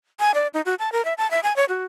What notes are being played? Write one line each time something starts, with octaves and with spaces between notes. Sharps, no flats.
G#5
D5
D#4
F#4
A5
A#4
E5
A5
E5
G#5
C#5
F#4